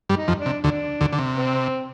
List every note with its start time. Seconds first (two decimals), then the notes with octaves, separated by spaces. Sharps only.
0.09 G2 G3
0.16 D#4
0.28 F2 F3
0.41 D4
0.46 C3
0.64 D2 D3 D4
1.01 D2 D3
1.13 D3
1.19 C3
1.37 C4